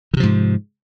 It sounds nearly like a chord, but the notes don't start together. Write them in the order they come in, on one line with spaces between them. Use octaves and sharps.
D#3 C3 F3 G#2